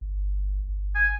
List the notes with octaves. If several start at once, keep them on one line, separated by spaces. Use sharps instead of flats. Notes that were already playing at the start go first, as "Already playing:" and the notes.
G1
G1
G#5